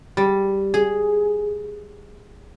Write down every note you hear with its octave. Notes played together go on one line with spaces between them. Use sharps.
G3
G#4